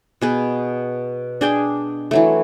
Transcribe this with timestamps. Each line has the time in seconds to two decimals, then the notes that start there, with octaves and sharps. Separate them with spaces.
0.21 B2 G#4 B4
1.41 D4 G#4 G5
2.11 E3 F#3 A3